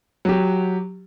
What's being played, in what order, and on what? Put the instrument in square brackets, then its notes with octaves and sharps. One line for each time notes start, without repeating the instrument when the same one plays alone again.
[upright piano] F#3 G4